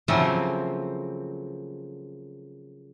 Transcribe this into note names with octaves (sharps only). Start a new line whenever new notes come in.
C#3 F3 F#3 A3 A#3 C4